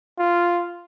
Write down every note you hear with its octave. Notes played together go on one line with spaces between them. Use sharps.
F4